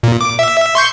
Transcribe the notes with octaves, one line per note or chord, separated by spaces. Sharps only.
A#2
D6
E5
C6 C#6 G6